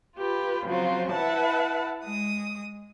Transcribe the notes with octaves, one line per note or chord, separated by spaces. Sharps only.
F4 G4 B4
C#3 F3 F#3 C4 F4
E4 B4 E5 F#5 A5
G#3 D#6